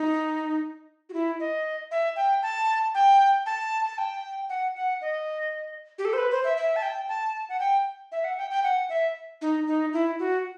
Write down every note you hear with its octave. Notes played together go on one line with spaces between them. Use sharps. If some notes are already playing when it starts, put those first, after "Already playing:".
Already playing: D#4
F#4
E4
D#5
E5
G5
A5
G5
A5
A5
G5
F#5
F#5
D#5
G4
A4
C5
B4
C5
E5
E5
A5
G5
A5
F#5
G5
E5
F#5
G5
G5
F#5
E5
D#4
D#4
E4
F#4